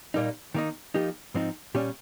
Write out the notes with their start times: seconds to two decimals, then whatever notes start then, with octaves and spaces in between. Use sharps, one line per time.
0.14 A#2 G3 A#3 D#4
0.54 D#3 A#3 D#4
0.94 F3 A#3 D#4 G4
1.34 G#2 F3 C4 D#4
1.75 A#2 G3 C#4 G4